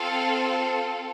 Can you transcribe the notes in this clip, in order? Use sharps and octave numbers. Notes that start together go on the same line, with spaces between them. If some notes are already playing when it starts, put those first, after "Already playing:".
Already playing: C4 F4 A4 F5